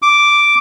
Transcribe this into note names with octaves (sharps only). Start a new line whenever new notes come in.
D6